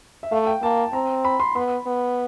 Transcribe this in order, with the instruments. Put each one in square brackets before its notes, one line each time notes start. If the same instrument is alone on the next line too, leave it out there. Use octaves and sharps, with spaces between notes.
[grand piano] E5
[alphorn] A3 [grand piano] F5
[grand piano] G5
[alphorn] A#3 [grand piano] A5
[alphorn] C4 [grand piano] A#5
[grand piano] B5
C6
[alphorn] B3 [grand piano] B5
[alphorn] B3